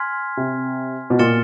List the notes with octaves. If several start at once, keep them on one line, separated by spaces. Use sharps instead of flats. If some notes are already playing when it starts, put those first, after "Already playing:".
Already playing: G#5 C6 F6 G#6 B6
C3
B2
A#2 F6 A6 C#7 E7 G7